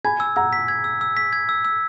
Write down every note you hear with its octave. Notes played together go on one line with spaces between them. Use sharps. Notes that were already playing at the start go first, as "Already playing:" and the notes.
G#5 B5 G#6
E6
F#5 A#5 E6
B6
G#6
E6
E6
B6
G#6
E6
E6